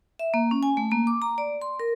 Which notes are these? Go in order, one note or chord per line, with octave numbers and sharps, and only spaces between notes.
E5
A#3
C#4
G#5
A3
A#3
D6
A#5
D5
C6
A#4